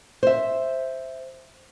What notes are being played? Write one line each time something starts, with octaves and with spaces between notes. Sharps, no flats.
C5 E5